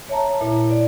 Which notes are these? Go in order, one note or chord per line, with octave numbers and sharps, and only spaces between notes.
C#5 E5 A5 A#5
A#2 E4 E5
D5